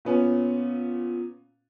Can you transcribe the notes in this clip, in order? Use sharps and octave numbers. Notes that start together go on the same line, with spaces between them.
A#2 B3 C#4